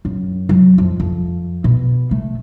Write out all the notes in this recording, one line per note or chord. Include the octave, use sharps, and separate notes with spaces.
F#2
F#3
F2
F2
B2
A3